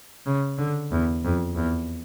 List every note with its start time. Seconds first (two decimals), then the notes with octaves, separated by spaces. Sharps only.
0.26 C#3
0.58 D3
0.92 E2
1.24 F2
1.56 E2